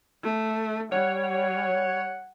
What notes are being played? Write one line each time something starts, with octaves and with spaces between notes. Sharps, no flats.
A3
G3 C#5 F#5
F#5